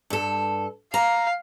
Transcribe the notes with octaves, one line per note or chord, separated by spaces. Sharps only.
G2 A4
F5 A#5